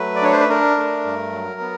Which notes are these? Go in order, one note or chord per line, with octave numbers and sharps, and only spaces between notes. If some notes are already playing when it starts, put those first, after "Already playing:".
Already playing: F#3 A3 B4
D5
D4 C#5
C5
B4
D4 A#4
A3
G2
F#3
B3